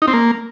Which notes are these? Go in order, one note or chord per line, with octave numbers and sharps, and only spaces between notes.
D#4
C4
A#3